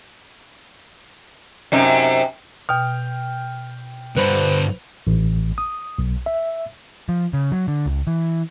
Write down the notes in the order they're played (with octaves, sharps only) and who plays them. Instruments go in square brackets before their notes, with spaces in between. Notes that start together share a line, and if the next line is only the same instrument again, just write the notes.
[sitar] F#2 C3 D#4
[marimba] B2 [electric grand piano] G5 F6
[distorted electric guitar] G2 D3 [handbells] B4 C5 B5
[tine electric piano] A1
D#6
B1
E5
[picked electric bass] F3
C#3
F#3
D3
C#2
E3